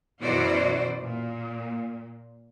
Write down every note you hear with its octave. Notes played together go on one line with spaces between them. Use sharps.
F#2 B2 E3 F#4 C5 D5
A#2